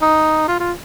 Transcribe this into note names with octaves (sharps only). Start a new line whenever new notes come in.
D#4
F4
F4